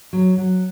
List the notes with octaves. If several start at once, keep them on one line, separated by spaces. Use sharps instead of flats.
F#3
F#3